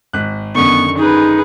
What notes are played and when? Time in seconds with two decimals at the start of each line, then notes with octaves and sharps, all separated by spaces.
0.13 G#1 F#6
0.55 F#2 D3 D#3 B3 C#6
0.98 D#4 G#4 B4